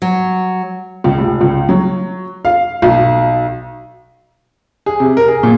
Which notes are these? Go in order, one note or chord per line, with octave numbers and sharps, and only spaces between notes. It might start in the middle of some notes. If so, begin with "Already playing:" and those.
F#3
C#2
F1
C#2
F#3
F5
B1
G#4
C3
A#4
G#4
A#2